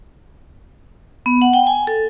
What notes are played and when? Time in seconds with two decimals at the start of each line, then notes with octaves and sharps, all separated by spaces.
1.26 B3
1.42 F#5
1.53 G5
1.67 G#5
1.87 A4